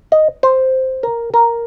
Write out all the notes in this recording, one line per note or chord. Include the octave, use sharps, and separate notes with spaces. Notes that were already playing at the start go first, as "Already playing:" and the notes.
D#5
C5
A#4
A#4